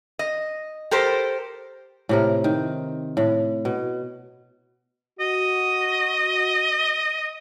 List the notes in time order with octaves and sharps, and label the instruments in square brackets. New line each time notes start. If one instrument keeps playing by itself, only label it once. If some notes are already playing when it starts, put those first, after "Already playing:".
[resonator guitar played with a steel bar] D#5
G4 A4 A#4 C5
[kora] A2 C3 A#4
D#3
A2
B2
[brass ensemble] F#4 [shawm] D#5